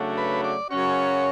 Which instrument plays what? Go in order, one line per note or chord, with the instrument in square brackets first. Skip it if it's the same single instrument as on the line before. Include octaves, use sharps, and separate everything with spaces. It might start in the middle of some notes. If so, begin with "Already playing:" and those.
Already playing: [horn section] C#3 F#3 A3 D4 F#4
[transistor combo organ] B4
D5
[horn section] F#2 C#3 F#3 C#4 F#4 [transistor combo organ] C#5